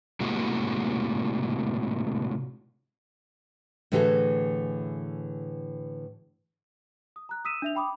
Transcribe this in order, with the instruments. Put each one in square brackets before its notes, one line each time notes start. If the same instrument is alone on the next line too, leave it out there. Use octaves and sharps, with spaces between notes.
[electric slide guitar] A2 C3 G#3 A#3 F#4
[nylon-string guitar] A2 D3 E3 F#4 G#4 A4
[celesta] D#6
A#5 F#6
D#6 E6 B6 D#7 E7
D4 E5 F7
G5 B5 D6 D#6